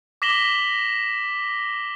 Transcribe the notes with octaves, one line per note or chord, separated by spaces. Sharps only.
D6 A#6 B6 E7 F#7 G7